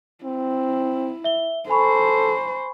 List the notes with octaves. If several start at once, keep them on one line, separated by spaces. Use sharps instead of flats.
C4 E4
E5 G7
A4 C5 G#5 B5 C#6